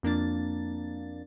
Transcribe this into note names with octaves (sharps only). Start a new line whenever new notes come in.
F2 A#3 D4 A6